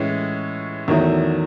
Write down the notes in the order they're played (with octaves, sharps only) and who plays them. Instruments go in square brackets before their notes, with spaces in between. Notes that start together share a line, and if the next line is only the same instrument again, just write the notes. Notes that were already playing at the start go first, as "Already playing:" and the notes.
Already playing: [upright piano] A2 E3 G#3 C#4
E2 D#3 F#3 A3 E4